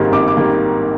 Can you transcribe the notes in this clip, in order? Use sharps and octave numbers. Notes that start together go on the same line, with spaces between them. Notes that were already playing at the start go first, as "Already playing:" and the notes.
Already playing: G#1 G#2 D#3 G3 A#3
G#1 D6
D6
D#3 G3 A#3